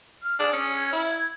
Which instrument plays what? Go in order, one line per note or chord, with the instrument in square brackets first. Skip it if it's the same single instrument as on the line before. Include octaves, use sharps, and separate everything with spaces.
[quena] F6
[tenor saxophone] D4 [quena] G#4
[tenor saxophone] C#4
[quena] G#6
[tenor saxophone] E4